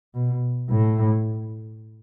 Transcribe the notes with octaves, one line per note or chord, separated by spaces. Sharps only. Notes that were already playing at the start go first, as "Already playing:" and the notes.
B2
A2